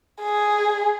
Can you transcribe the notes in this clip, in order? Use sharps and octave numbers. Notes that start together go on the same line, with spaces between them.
G#4